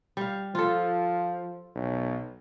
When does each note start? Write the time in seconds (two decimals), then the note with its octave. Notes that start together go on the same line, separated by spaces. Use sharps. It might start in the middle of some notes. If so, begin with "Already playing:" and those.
0.17 G3 F5
0.55 F3 F4 A4
1.75 B1